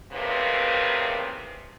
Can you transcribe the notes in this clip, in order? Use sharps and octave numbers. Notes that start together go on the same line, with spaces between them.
E2 A2 C3 D#3 A#3 B4